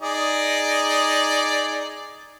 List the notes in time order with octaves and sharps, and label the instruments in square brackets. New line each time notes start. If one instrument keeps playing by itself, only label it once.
[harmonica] D#4 G#4 D5